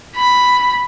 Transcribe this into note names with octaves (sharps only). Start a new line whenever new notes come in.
B5